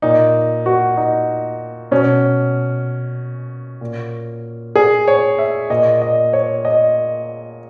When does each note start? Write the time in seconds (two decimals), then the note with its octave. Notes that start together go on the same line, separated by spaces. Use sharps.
0.02 A#2 D#4
0.66 F#4
0.97 D#4
1.91 B2 C#4
3.81 A#2
4.75 G#4
5.08 C#5
5.39 E5
5.70 A#2 D#5
6.02 D#5
6.33 C#5
6.65 D#5